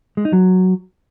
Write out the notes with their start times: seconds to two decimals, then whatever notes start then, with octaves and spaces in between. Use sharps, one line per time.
0.17 G#3
0.25 D#4
0.33 F#3